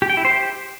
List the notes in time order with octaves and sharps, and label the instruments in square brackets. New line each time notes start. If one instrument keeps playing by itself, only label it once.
[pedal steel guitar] G4
G5
E4
C5
G4